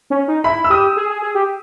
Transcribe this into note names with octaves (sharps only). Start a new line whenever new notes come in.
C#4
D#4
E4 B5
E6
G4 D#6
G#4
G#4
G#4
G4